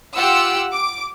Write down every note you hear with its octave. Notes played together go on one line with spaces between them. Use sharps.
F4 G4 F#5 E6
D6